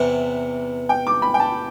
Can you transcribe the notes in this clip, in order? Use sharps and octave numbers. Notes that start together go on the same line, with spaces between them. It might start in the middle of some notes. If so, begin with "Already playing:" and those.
Already playing: E2 C3 E3 B3
G5
D6
B5
G5
A5